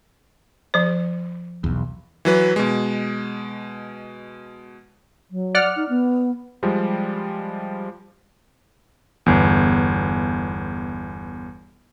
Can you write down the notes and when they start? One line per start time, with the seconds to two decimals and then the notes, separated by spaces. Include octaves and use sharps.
0.74 F3 C5
1.64 B1 E2
2.25 E3 F#3 B4
2.56 B2 G#3
5.31 F#3
5.55 D5 F#5 F6
5.76 D#4
5.89 B3
6.63 F3 G3 G#3
9.26 G1 E2